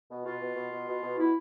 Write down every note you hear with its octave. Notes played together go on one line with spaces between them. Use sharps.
B2
B2 F4
B2
B2
B2
B2
B2
B2 E4